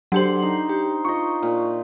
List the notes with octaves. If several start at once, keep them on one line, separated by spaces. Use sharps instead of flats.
D3 F#3 G4 C5 F#7
D#4
G4
F4 D#5 C#6
A#2